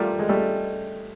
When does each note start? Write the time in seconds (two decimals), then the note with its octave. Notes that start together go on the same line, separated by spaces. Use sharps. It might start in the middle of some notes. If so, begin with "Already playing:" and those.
Already playing: G3 A3 F4 A#4 D5
0.19 G#3
0.29 G3 A3